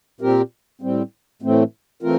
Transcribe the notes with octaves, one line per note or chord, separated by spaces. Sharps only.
A#2 G3 C4 G4 A#4
A2 G3 C4
A2 E3 A3 C4
E3 A3 C4 F4 A#4